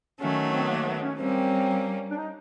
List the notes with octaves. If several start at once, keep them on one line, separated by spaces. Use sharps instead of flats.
D#3 F#3 A3 C#4
C4
B3
A#3
B3
C#4
G3 A#3 C4 C#4
D4
D#4